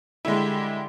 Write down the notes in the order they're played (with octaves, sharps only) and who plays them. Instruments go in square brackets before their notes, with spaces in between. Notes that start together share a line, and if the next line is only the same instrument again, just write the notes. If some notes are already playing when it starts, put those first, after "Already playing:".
[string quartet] D3 G3 G4 [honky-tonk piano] G#3 E4